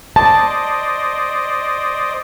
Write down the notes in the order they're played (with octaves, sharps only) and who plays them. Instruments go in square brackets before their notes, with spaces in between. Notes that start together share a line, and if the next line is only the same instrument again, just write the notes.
[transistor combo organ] C5 D5 D#5 [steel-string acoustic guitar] A5